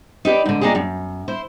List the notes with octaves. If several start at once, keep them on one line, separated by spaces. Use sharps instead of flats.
D#4 G4 B4 D5
G#2 D3
A#3 D4 D#4 F4 G4 G#4
F#2
E4 C5